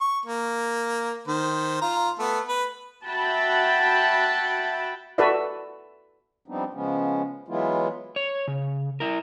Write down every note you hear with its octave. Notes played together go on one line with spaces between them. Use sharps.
C#6
A#3
D#3 C5
F4 A#5
A3 B3
B4
F#4 E5 F#5 G5 A5 B5
F#4 A4 B4 D5 E5
F3 G3 B3 C4 D4 D#4
C#3 F3 G#3 B3 C#4
E3 F#3 G#3 B3 E4 F4
C#5
C#3
E4 A#4